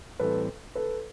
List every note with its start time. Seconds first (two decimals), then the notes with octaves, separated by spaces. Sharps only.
0.20 A2 E3 G3 C4 A4 B4
0.75 A4 B4